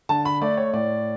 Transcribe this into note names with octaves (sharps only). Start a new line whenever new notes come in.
D3 A5
B5
A3 D5
C#5
A2 D5